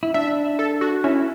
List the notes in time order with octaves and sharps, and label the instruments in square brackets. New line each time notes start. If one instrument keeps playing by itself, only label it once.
[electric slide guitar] E4
[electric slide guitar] D4 [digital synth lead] E5
[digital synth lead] A4
F#4
[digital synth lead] C#4 [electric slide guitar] E4